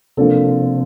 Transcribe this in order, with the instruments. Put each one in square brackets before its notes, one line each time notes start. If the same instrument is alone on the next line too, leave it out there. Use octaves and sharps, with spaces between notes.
[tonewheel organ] C3 C4 [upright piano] F3 A#3 D4 A4